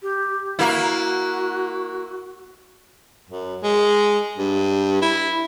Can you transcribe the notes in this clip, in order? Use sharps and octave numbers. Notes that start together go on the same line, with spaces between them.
G4
A#3 E4 F#4
F#2
G#3
G2
E4